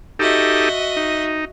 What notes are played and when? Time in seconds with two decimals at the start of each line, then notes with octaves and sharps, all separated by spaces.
0.19 D#4 F#4 G4 A4 D#5 E5
0.97 D#4